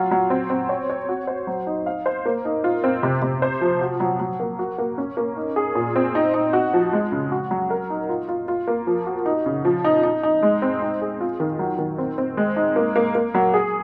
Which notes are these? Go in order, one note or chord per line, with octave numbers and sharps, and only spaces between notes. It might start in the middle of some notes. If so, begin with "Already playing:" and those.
Already playing: F#3 F4
F#3
C4
C4
C#5
C#5
F#4
C5
F#3
D#4
F5
C5
A#3
D#4
F4
C4
C3
C3
C5
F3
F#4
F#3
F#3
A#3
F#4
A#3
C#4
A#3
D#4
G#4
A#2
C4
D#4
D#4
F#4
F3
G#3
C#3
F#4
F#3
A#4
D#4
F4
F4
F4
A#3
F3
F#4
D#4
C#3
F3
D#4
D#4
D#4
G#3
C4
D#4
G#4
F4
D#3
F#3
D#3
C4
C4
G#3
D#4
A#3
A#3
A#3
F#3
G#4